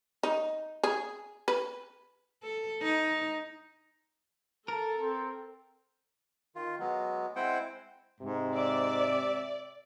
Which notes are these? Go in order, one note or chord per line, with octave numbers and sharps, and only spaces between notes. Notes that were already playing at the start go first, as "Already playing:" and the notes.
D#4
G#4
B4
A4
D#4
A4 A#4 A5
C4
D#3 F4
F#3 G#3 B3
G#3 C4 E4 C5 F#5 G5
G#2 C3
D5 E5